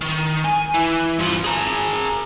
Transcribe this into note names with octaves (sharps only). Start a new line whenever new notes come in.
D#3
G#5
E3
G2 F3
G#4 A#4